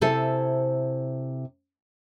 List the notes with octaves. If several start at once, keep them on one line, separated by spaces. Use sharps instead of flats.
C3 E4 A4 C5 G#5